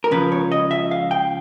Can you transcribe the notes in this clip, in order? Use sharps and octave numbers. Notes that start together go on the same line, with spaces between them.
A#4
C#2 C#3 F3 B4
C#5
D#5
E5
F5
G5